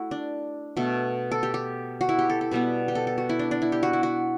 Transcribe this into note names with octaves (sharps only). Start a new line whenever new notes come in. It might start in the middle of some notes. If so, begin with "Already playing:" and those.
Already playing: A3 E4 F#4
D4
B2 A3
A4
G4
G4
F#4
E4
G4
A4
A4
B2 G3 B3 B4
G4
A4
A4
F#4
E4
D4
D4
E4
G4
F#4
E4
F#4